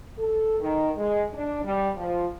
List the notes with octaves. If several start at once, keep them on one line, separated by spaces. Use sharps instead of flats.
A4
D#3
G#3
D4
G3
F3